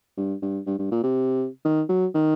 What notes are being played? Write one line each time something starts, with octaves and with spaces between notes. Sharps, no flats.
G2
G2
G2
G2
A#2
C3
D#3
F#3
D#3